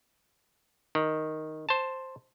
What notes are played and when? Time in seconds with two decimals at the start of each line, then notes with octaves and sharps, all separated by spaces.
0.95 D#3
1.69 C5 A5